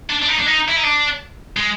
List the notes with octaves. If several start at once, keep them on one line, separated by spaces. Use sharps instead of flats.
D4
D4
D#4
D4
D#4
E4
D#4
D4
G#3